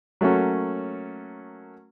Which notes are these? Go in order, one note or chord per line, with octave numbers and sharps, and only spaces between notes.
F#3 A3 A#3 C#4 F#4